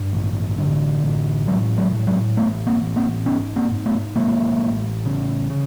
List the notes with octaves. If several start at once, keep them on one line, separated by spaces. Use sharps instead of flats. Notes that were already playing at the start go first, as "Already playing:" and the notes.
Already playing: G2
A1
D3
A1
A2 F#3 G#3
F#3 G#3
A2
F#3 G#3
A1 A3 B3
A#3 C4
A1
A#3 C4
G#2 B3 C#4
A#3 C4
G#2
A3 B3
A1 G#3 A#3
A1
C#3
C#3